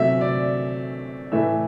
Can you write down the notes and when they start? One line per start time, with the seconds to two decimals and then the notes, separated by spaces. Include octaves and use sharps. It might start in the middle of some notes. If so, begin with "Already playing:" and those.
Already playing: C3 F#3 A3 E5
0.21 D5
1.32 A2 E3 A3 E5